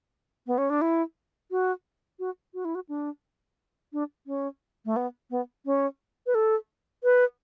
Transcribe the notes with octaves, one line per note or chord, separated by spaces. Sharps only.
B3
C#4
D4
E4
F#4
F#4
F#4
E4
F#4
D4
D4
C#4
A3
B3
B3
C#4
B4
A4
B4